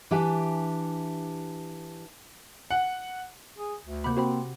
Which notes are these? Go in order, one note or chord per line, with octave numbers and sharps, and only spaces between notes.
E3 D4 G4 E5 G#5
F#5
G#4
D2
C3 A#3 F#5 B5 D6 G6
C4 F#4 C5 B5